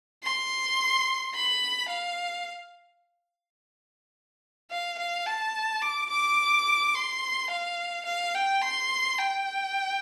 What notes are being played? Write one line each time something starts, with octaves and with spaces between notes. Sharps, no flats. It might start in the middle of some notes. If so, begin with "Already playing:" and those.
C6
B5
F5
F5
F5
A5
D6
D6
C6
F5
F5
G5
C6
G5